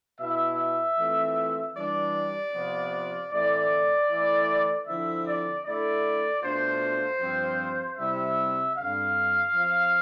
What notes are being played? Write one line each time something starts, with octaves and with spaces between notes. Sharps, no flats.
B2 B3 E4 E5
E3 A3 C4 F4
E3 G3 D4 D5
C3 F3 B3 F4
A2 E3 A3 C4 D5
E3 A3 E4
D3 F3 C4 E4 E5
D5
D3 A3 E4 D5
B2 A3 D4 F4 C5
G2 F3 C4 F4
C3 G3 C4 E4 E5
G2 D3 G3 C4 F5
F3 C4 F4